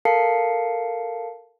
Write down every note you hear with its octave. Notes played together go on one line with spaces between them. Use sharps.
A4 A#4 F5 A5 C7 C#7